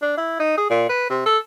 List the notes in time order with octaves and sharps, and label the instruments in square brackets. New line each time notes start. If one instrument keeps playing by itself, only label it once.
[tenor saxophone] D4
E4
D#4
G#4
A#2
B4
C3
A4